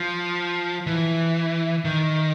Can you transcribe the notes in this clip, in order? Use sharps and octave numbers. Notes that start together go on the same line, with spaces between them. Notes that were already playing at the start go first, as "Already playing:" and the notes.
Already playing: F3
E3
D#3